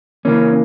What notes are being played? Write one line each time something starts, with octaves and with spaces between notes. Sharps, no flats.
C#3 E3 A#3 C#4